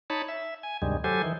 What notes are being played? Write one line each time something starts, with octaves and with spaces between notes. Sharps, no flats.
D#4 C#5 A5 B5
E5
G#5
D2 G2 C3 D#3 G3 G#3
F#3 G4 A4 C5 G#5
D#3 E3